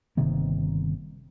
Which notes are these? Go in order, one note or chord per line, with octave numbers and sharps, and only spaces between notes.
G1 C3 D#3 A#3